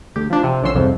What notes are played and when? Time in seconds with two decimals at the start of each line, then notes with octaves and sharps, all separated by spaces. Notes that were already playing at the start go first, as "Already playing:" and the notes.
0.16 D2 G4
0.30 F3 D4
0.44 C3
0.63 A#1 D3 F3 C#4 C6 E6
0.74 C2 F2 G#2